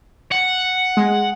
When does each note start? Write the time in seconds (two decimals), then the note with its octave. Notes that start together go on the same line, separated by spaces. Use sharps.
0.32 F#5
0.97 G#3